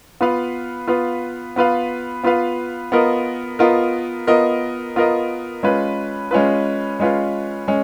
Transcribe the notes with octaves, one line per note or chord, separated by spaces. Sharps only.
B3 F4 B4 F5
B3 F4 B4 F5
B3 F4 B4 F5
B3 F4 B4 F5
B3 F4 A#4 D#5
B3 F4 A#4 D#5
B3 F4 A#4 D#5
B3 F4 A#4 D#5
G#3 C#4 F4 B4
G#3 C#4 F4 B4
G#3 C#4 F4 B4
G#3 C#4